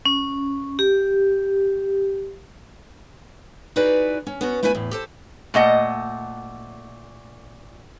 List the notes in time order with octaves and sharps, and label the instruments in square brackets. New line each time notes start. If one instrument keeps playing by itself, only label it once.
[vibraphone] C#4
G4
[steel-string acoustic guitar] D#4 E4 F#4 G#4 B4 D5
C#4
B3 C#4 F#4
A3 E4 B4 E5 G5 G#5
E2 A2
G4 A4 C5
[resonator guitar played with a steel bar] A#2 A3 D#5 F#5